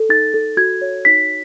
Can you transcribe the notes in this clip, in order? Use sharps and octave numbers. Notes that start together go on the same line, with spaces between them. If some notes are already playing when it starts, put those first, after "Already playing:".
Already playing: A4
D#4 A6
A4
F#4 G#6
C#5
D#4 B6